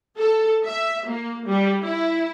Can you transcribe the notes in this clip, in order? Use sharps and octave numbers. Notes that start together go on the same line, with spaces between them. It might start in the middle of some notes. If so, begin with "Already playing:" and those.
A4
E5
A#3
G3
E4